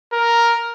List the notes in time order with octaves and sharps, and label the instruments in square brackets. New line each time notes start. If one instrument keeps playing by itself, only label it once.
[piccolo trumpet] A#4